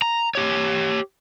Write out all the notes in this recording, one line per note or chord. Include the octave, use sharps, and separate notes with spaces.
A#5
G4 C#5